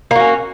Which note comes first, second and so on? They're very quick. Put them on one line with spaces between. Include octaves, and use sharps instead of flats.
A#3 F#4 C#4